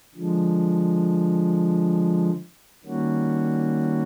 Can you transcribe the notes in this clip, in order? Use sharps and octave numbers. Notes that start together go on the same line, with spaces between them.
D3 F3 G#3
D#3 G3 A#3 C#4 F#4